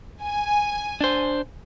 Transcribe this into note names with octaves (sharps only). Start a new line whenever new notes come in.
G#5
D4 C5